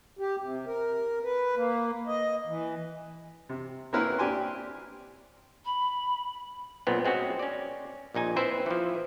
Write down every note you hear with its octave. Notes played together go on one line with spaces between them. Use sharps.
G4
C3
A#4
B4
A#3
D#5
E3
C3
A#3 C4 C#4 E4 A#4 B4
C4 D4 G4 G#5 C6
B5
B1 A#2 B3 C4
G#3 C4 C#4 F#4
C#4 D5
A#1 A#2 D#4 G#5
C4 E4 B4 C5 E5
E3 F3